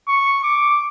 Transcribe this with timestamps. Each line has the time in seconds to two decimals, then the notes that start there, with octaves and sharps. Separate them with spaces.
0.08 C#6
0.43 D6